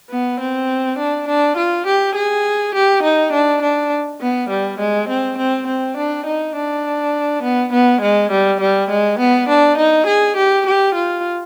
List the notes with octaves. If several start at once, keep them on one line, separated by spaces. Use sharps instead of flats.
B3
C4
D4
D4
F4
G4
G#4
G4
D#4
D4
D4
B3
G3
G#3
C4
C4
C4
D4
D#4
D4
B3
B3
G#3
G3
G3
G#3
B3
D4
D#4
G#4
G4
G4
F4